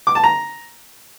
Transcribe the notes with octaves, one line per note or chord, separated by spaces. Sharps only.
D6
A5
A#5